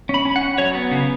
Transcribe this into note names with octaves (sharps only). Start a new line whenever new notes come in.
C#4 B5
C#4
F#5
C#4
F#3 C#5
B3
C#3